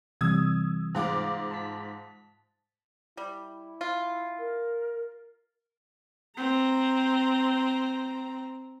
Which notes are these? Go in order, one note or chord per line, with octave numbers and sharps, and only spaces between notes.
C3 E3 G3 D#6 E6 G#6
G#2 F4 D6
A5 B6
G3 E4
F4
A#4
C4 A#5